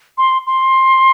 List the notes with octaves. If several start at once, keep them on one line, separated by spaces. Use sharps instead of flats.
C6
C6